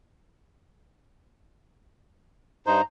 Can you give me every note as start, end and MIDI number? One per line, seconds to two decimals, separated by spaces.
2.67 2.81 43
2.67 2.81 63
2.67 2.81 72
2.67 2.83 82